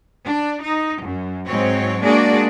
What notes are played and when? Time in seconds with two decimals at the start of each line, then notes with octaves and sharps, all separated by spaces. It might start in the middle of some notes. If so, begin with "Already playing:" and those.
0.23 D4
0.61 D#4
1.02 F#2
1.45 G#2 F#3 C4 C#5
2.02 G#3 A#3 D4 F#4 G#4 D5